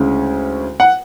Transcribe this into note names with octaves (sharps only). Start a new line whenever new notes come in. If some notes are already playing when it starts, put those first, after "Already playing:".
Already playing: D2 C#3 G#3 C#4 E4
F#5